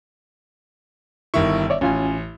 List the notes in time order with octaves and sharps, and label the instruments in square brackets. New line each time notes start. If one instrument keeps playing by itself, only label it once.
[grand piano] G1 D#3 E4 [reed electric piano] C#6
[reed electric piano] C#5 D5 E5
[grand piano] A1 [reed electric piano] C#4 F4 G#5